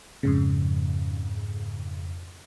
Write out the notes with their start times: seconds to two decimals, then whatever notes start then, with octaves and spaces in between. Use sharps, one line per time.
0.23 F2 G#2 C#3